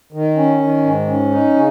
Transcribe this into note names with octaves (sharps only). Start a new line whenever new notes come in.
D#3
C#4
D#3
G#2
C#4
D#4
C#3